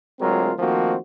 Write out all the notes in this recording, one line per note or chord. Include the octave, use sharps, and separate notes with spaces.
D2 F#3 G#3 C4 F4 A#4
D#3 F3 A3 A#3 C4 F#4